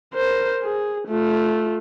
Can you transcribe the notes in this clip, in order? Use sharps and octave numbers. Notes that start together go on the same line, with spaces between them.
A#4 C5
G#4
A3 F4